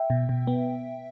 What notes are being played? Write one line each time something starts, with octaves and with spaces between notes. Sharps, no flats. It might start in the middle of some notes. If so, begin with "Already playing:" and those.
Already playing: E5 G5
B2
B2
B3